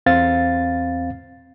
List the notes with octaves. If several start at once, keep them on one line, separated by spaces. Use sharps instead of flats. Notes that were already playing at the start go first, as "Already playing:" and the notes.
E2 C4 F5 A6